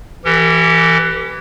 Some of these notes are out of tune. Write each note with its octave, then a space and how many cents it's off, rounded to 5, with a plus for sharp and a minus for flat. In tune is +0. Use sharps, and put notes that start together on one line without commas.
E3 +10 G4 -15 A#4 -45